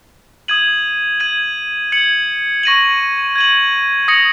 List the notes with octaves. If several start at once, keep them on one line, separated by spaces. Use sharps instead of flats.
D#6 G#6 D#7 F#7
G#6 D#7 F#7
G#6 C#7 F#7
C#6 A#6 D#7 F#7
G#6 D#7 F#7
D#6 A#6 C#7 F#7